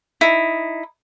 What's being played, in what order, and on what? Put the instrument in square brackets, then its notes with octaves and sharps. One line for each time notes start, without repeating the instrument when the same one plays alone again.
[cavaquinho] D#4 E4